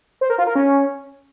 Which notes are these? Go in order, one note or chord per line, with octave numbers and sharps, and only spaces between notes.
C5
A#4
F4
A#4
C#4